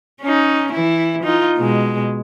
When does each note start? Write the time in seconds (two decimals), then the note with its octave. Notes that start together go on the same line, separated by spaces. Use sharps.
0.21 C#4 D#4
0.73 E3 E4
1.24 D#4 F4
1.58 B2 G#3